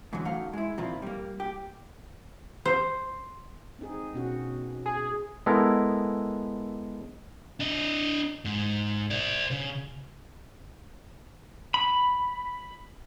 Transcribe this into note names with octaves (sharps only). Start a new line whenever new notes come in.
G#2 D3 E3 F#3
F#2 A3 D#4 F5 F#5
G#3 E4
A#2 D#3 F3 C4 E4 F4
G3 A#3
G4
C5
C4 D#4 G#4
B2 C#4 F#4
G#4
G#3 B3 E4 A4 A#4
D4 D#5
G#2
C5 D5
C#3
B5